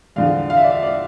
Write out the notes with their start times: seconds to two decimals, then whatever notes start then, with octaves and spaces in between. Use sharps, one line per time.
0.16 E2 D3 F3 F5
0.50 F5
0.57 E5
0.64 D5
0.71 E5
0.83 D5